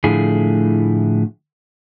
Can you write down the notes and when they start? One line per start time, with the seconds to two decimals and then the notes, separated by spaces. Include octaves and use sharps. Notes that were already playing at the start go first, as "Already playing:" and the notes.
0.04 A2 D3 F3 A3 E4 G#4